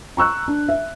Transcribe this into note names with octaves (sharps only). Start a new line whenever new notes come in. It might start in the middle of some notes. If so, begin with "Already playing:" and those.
A#5 C#6 E6 F#6
D4
E5